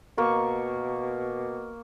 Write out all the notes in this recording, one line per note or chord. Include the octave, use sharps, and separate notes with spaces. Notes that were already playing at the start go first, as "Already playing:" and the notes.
B2 A#3 C#6